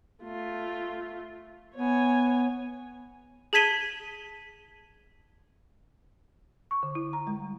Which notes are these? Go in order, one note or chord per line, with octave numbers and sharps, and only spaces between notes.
A3 F4
B3 C#5 G#5
G#4 A5 G#6 B6 D#7 G7
C#6
D3
E4
A#5
G#3
G3